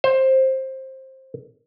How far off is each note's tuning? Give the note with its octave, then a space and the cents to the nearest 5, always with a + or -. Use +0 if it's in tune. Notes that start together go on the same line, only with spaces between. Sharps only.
C5 +15